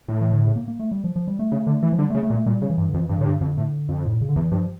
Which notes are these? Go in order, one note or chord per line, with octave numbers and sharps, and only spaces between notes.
A2 A3
E3
D3
C#3
A#3
A#3
A3
G3
F3
F3
G3
A3
C#3
D3
E3
F3
D3 G3
A3
C#3
A3
A#2
A3
A#2 G3
C#3
E3
G2
D3
F2 E3
G2 E3
A2 D3
G2
F2 D3
A2
F2
A2
A#2
C#3
D3
E2 E3
G2 F3